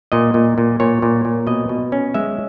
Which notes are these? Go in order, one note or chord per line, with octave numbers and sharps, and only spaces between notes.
A#2 D#5
A#2
A#2
A#2 C#5
A#2
A#2
B2 D#5
B2
C#4
G#3 E5